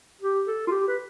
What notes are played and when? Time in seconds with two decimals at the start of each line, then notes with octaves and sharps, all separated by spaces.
0.21 G4
0.47 A4
0.67 F4
0.71 G4
0.88 B4